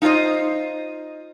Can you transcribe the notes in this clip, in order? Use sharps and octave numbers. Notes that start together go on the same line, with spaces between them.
D#4 F4 G#4 C5 D#5